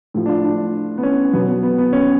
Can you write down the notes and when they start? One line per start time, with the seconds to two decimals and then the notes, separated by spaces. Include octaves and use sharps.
0.14 A2 F3
0.26 D4
0.29 F4
0.44 D4
0.98 B3
1.03 C#4
1.33 B2 F#3 B3
1.48 B3
1.63 B3
1.78 B3
1.93 C#4